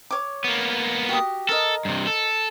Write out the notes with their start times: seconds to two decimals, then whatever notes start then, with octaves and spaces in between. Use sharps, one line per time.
0.11 C#5 D6
0.44 A#3 B3
1.09 F#4 G4 D#6
1.49 A4 A#4 D#5
1.85 G2 C3
2.07 A4